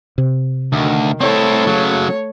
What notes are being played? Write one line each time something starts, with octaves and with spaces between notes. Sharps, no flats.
C3
D2 D#3
A3 C4 E4 A4 C#5
C#3 F#3